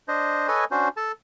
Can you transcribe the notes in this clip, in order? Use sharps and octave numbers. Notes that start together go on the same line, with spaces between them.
D4 C5 D#5
A4 B4 C#5 D#5 G#5
C#4 D4 F#4 C5
A4 A5